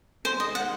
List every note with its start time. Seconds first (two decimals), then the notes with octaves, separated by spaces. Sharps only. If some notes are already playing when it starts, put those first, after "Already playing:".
0.25 C3 D#3 G#3 C5
0.40 D#5
0.55 F#5